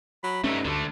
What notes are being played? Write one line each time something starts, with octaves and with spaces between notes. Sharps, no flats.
F#3 B5
G2 A3 C#4 D#4 E5
D2 D3 A3 D4